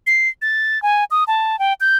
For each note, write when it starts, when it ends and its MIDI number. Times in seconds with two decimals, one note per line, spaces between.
0.07 0.29 96
0.42 0.81 93
0.82 1.04 80
1.11 1.24 87
1.27 1.59 81
1.59 1.73 79
1.80 1.98 91